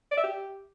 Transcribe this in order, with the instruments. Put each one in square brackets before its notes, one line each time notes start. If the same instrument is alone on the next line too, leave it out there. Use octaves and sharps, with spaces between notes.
[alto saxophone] D5
E5
G4